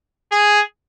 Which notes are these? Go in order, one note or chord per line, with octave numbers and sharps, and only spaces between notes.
G#4